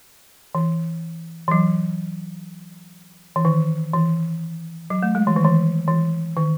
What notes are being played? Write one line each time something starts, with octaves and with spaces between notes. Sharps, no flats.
E3
E3
F#3
E3
D#3
E3
F#3
A3
G#3
E3
D#3
E3
E3
D#3